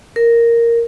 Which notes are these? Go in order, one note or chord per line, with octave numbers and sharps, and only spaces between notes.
A#4